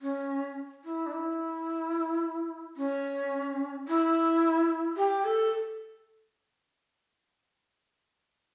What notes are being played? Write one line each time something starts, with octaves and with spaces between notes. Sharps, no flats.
C#4
E4
D4
E4
C#4
E4
G4
A4